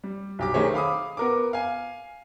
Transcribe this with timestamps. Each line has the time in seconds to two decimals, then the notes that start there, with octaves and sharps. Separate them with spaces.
0.04 G3
0.39 B1 G4 D6
0.54 D#3 A3 G4 G#4 C5 C#5
0.74 F5 B5 D6 D#6
1.17 B3 A#4 D6
1.53 F5 G#5